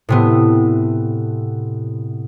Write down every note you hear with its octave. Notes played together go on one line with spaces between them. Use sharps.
A2 C3 B3